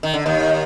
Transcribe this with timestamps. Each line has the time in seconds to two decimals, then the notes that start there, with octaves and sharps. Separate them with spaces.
0.03 D#3
0.14 D3
0.26 D#2 D#3